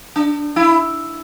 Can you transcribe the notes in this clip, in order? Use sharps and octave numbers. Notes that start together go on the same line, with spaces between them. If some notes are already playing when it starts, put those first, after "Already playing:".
D4
E4